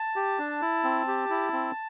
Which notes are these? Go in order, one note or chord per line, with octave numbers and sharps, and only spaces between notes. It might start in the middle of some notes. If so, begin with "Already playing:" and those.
Already playing: A5
G4
D4
E4
C4
G4
E4
C4